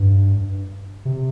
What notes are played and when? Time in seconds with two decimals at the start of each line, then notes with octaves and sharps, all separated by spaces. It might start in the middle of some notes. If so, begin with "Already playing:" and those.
Already playing: G2
1.05 C3